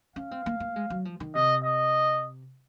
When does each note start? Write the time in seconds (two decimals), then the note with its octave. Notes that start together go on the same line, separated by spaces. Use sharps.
0.16 C#4 F5
0.31 C4
0.46 A#3
0.60 A#3
0.76 G#3
0.90 F#3
1.05 F3
1.20 D#3
1.35 C3 D#5
1.64 D#5